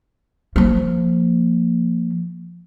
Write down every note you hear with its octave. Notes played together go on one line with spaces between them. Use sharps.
F3 A#3